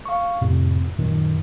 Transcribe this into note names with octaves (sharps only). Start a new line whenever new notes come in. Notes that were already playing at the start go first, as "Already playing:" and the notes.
F5 C#6
F2 A2 C3
F#2 A#2 D#3